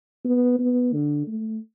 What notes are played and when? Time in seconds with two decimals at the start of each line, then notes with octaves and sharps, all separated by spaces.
0.25 B3
0.59 B3
0.93 D3
1.28 A3